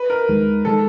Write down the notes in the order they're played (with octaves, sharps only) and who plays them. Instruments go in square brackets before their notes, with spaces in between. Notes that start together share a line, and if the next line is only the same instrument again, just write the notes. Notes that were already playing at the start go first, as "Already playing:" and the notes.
Already playing: [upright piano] B4
A#4
[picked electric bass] D#2 D#3 G#3
[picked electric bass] D#3 G#3 [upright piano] A4